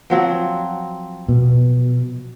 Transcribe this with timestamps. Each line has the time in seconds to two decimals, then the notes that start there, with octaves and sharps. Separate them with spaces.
0.10 F3 F#3 C4
1.29 B2